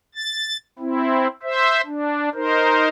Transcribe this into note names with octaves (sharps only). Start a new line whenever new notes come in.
A6
C4 E4
C5 E5
D4
D#4 A#4 C5